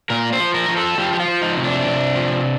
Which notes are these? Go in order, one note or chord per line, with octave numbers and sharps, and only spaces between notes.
A#2 A#4
C5
F3
A#4
F3
A4
F3 G4
G4
F4
F3
D#4
C3
D4
C3
F3